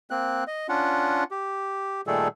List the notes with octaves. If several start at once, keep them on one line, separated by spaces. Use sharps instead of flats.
A#3 C4 F#6
D#5
C#4 D4 F4 F#5
G4
A#2 D#3 G3 A3 G#4 A4